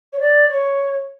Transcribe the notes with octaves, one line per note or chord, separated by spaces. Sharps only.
C#5
D5
C#5